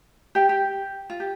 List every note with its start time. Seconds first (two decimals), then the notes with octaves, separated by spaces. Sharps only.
0.35 G4 G5
0.49 G4
1.10 F4
1.20 G4